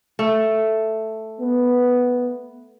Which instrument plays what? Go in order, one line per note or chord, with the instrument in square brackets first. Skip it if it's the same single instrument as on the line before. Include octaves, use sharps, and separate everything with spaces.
[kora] A3
[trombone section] B3